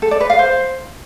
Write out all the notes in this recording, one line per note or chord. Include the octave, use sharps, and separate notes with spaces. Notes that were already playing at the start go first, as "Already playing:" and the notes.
A4
D5
B4
F5
C5